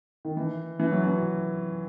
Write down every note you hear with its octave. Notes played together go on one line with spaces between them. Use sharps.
D#3
E3
E3
F#3
E3